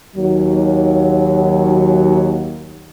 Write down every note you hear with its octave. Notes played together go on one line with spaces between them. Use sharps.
D#2 F#3